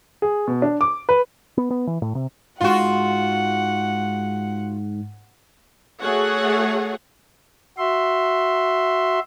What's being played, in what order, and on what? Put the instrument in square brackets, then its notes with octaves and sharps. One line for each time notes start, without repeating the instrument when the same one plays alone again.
[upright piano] G#4
B2
D4
D6
B4
[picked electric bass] B3
B3
E3
A2
C3
[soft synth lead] G#2 [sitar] F4 F#4 [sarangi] F#5
[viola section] A3 F#4 G#4 C#5 F#5
[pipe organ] F#4 E5 C6